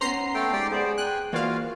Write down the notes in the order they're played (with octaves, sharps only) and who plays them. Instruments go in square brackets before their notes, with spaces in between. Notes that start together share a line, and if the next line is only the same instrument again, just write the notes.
[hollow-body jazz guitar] B3 C#4 C5 [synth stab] A#5 C6 C7
[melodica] A3 A4 G5
[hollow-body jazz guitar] G#2 [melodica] G4 D5 G5
[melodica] B3 C5 [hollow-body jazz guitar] G#4 D5
[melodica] G5 G#5 [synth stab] F#6
[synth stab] E3 F5 [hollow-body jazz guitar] A#3 C5 D5 [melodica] F4 F#4